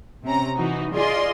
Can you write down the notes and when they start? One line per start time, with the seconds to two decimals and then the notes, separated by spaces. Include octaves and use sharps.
0.24 C3 C#4 A#5
0.57 E3 D#4 F#4
0.95 F4 G#4 D5 D#5 C6